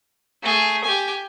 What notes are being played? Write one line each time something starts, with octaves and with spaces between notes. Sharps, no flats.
A3 G#4
G4 G#5